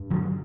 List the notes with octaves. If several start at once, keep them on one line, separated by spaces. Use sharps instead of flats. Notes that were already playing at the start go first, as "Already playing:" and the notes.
Already playing: G2
D3 F#3